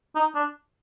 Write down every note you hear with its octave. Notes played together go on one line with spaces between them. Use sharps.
D#4
D4